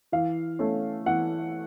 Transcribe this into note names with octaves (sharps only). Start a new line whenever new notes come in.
E3 F5
A3 C#4
E3 F#5